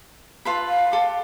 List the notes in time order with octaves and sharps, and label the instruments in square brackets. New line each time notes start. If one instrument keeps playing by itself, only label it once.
[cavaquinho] F4 A4 B4
[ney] F5
[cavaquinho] G4 A4